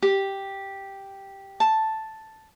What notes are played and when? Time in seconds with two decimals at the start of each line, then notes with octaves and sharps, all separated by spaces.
0.02 G4
1.60 A5